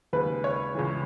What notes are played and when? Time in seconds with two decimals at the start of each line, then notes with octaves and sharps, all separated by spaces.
0.13 D#2 C#3 G#3 B4
0.44 C#5
0.75 C#2 C#3 E3